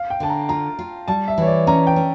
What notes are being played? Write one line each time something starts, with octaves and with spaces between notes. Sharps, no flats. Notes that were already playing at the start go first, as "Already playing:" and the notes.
Already playing: F5
G5
D3 A5
A#5
F4 A#5
F4
G3 A5
E5
E3 C#5
D5
C#4 A#5
G5
C#4